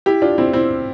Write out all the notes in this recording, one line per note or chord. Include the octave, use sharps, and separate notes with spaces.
E4 G4
D4 F4
C4 E4
C4 E4